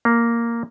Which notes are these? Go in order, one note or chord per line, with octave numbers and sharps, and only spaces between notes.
A#3